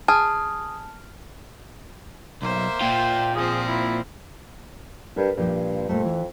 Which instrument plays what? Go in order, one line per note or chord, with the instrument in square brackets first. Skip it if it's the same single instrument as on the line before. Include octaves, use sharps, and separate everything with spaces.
[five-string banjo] G#4 [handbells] A5 [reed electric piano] D#6 [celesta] F6
[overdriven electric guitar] B1 [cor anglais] A#3 [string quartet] C5 E5
[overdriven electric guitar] A#2 F4 [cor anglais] G5
[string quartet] F3 C4 [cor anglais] G#4
[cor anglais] E4
[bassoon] G2 [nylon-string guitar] A#4 B4
[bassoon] G2 [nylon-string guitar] A#2 F3 G4
[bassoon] F2 [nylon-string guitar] A#2 G3 A3
[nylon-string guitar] E3